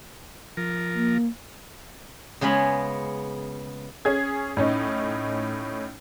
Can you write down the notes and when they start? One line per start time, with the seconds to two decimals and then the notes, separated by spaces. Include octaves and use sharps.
0.57 F3 A#4
0.94 A#3
2.41 C#3 G#3 B3 G#5 B5
4.05 C#4 G#4 G#6
4.57 A2 C#4 D#4